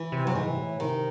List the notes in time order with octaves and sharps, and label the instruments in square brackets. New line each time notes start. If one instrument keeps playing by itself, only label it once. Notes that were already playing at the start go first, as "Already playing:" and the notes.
Already playing: [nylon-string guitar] E3
[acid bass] C3
[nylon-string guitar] F#3
[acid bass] G#2 [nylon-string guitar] E3
[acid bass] C3
A2
[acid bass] C3 [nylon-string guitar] D#3